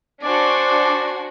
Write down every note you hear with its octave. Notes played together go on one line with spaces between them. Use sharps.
D4 F#4 C5 D5 G#5